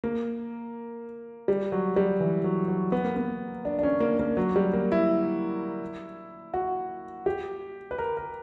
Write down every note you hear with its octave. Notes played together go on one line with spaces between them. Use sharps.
A#3
G3
F#3
G3
E3
F#3
F#3
B3
A#3
B3
D4
D4
C#4
A#3
A#3
F#3
G3
A#3
E4
F#4
G4
B4
A#4
A#4